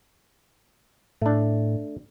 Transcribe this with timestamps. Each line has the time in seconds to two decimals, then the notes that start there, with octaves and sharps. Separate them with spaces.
1.22 A2 A3 D4